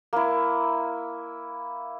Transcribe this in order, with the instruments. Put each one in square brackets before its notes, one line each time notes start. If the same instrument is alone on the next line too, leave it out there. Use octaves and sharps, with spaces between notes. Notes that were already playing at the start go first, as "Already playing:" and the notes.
[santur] A#3 E4